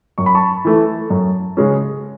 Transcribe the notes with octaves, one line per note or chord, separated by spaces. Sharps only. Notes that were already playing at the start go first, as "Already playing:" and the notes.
F#2 C#6
B5
A5 C#6
E3 A3 E4
F#2
C#3 G#3 C#4